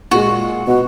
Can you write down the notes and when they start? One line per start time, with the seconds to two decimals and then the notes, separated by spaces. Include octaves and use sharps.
0.11 A#2 G#3 F#4
0.67 B2 F#4